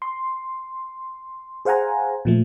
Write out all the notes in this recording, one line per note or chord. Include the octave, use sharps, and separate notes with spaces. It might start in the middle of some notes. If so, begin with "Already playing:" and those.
C6
G#4 C5 F5 F#5 G#5 A#5
A#2 F3 A3